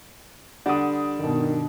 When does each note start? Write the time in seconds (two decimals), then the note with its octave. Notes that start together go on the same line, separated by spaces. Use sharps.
0.66 D3 G3 D4 F#5 D#6
1.19 G2 B2 D#3